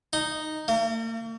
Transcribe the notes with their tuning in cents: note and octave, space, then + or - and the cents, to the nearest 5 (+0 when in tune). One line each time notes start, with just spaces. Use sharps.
D#4 -5
A#3 -45